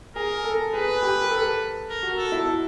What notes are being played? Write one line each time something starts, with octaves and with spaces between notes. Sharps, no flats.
G#4 A#4
A4
G#4 B4
G4
A#4
A4
A#4
F#4
A4
E4